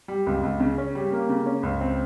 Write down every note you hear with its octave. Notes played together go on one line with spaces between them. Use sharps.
G3
C#2
C#2
C#3
C#4
G3
A#3
C#3
C#4
C#2
C4